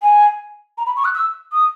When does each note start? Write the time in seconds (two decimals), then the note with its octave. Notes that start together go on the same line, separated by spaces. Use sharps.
0.02 G#5
0.78 A#5
0.86 B5
0.96 C#6
1.05 F#6
1.15 E6
1.52 D#6